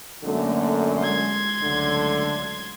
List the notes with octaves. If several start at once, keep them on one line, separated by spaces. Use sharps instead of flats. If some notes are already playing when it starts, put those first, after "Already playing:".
F#2 D3 A3 A#3
G#3 C6 G#6
C#2 D3 F#3 A3